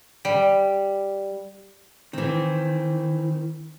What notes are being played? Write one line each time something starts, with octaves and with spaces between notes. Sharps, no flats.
G3
D#3 E3 C4